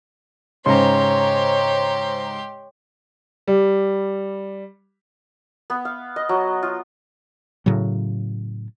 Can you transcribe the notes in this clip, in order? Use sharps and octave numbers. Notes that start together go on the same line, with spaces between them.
G#2 C#3 G4 C5 C#5 A#5 C6
G3
B3
F5
D#5
F#3
F4
A2 C#3 F#3